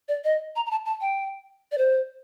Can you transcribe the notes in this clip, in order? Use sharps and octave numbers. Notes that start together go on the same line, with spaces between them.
D5
D#5
A#5
A#5
A5
A5
G5
D5
C5